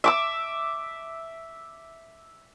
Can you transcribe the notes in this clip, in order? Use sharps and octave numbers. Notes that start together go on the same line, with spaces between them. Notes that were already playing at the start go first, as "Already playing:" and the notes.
E5 D6 E6